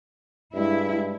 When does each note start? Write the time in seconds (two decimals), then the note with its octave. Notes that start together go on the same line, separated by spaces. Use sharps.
0.54 G2 G#3 E4